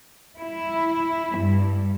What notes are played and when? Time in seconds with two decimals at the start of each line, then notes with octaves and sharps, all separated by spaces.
0.41 E4
1.37 G2